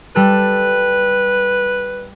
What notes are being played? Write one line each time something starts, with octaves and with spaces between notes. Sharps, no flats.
G3 A4 B4